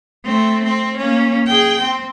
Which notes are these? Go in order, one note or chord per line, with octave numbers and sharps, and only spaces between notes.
A3 C4
C4
A#3 C#4
G#4 G5
C4